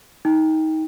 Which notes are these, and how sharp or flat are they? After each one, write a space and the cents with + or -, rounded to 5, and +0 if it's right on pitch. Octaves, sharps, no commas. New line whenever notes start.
D#4 +25 G5 +15